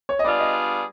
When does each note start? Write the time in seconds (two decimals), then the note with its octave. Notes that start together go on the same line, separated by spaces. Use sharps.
0.09 C#5
0.19 D#5
0.24 G3 B3 D4 F4 G#4 D5
0.39 D#5